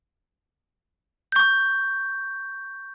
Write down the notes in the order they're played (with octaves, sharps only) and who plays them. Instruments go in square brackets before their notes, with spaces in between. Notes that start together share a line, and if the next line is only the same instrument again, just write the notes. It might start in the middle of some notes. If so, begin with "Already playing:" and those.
[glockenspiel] C#6 G6